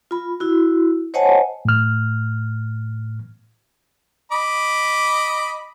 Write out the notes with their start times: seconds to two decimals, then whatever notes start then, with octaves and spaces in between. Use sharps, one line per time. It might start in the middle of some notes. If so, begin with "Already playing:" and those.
0.11 F4 B5
0.40 E4 F#4
1.14 C5 C#5 D#5 F#5 G#5 A5
1.65 A2 F6
4.32 D#5 B5 D6